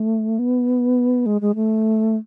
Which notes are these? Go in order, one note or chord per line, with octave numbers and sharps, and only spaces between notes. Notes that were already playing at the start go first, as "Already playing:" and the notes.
Already playing: A3
B3
G#3
G#3
A3